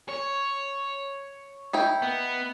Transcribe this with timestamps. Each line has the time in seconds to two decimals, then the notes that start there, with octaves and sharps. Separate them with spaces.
0.09 C#5
1.73 D#4 E4 G5
2.02 B3